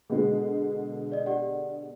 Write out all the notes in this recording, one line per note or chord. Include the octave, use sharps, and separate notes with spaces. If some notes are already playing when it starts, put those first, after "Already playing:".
B2 D3 G#3 G#4
D5 D#5
G4 D5 F#5